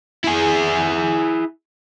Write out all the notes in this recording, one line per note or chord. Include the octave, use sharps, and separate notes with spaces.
E4 G#4